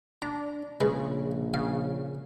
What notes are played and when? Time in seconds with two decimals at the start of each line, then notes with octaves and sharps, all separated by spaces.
0.22 D4 A#5
0.81 A#1 C#3 G#3 B4
1.54 C#3 F5